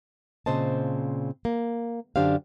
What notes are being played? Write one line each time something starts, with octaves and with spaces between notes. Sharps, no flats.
A#2 C#3 C4 C5 D#5 A5
A#3
F#2 D3 D4 G4 C5 F5